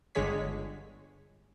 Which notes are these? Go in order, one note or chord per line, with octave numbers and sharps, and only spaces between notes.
G1 D3 G#3 G#4 C#5 B6